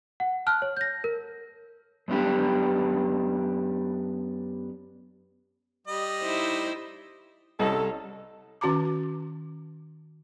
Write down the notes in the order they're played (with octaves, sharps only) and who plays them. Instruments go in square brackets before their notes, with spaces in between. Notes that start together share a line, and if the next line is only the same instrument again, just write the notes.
[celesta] F#5
A5 F6 F#6
C#5
G6 A#6
A#4
[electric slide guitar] F#2 B3 D4 G4
[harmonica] G3 D#5
[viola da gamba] D#4 E4 C5
[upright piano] C2 D#5 [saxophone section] C#4 A4
[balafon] D#3 C#4 F#4 A5 A#5 D6